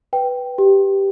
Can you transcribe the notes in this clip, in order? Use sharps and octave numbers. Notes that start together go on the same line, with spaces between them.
B4 G5
G4